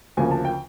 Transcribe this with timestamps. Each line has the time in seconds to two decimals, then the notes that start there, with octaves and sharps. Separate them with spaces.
0.17 D2 C#3 F3 A#3 G#5
0.31 A5
0.45 G5